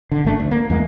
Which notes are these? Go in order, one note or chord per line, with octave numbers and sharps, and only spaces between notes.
D3
G#1 A3 D4
D2
A#3
E2 G#3 A#3